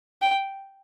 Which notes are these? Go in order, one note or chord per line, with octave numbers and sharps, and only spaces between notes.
G5